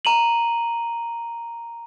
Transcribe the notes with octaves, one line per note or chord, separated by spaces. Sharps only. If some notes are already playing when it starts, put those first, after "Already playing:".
A#5 D#7 F#7